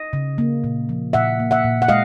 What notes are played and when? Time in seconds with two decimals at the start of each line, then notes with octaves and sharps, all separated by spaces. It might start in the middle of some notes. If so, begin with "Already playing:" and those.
Already playing: D#5
0.13 C#3
0.38 A#3
0.64 A#2
0.89 F3
1.13 A#2 E5 F#5
1.40 A#3
1.51 E5 F#5
1.64 A#2
1.82 F#5
1.88 G#3 D#5 F5